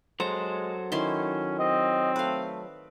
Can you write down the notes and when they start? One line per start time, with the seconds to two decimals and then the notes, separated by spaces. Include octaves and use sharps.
0.20 F#3 G#3 A4 C5 A#5
0.92 D#3 C#4 E4 C6
1.59 C4 D#5
2.16 A3 B4 F5